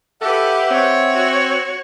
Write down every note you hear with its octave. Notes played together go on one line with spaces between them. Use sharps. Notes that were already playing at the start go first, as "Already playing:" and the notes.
G4 A4 B4 E5 F#5
C4 C#5
F#4